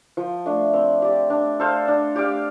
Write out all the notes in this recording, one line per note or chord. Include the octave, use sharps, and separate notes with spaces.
F3
A3 D4
C4
G4 D5
D4
A4 C5 F5
D4
G4 D5 F5